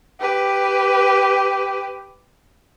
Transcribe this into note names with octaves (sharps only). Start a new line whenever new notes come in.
G4 B4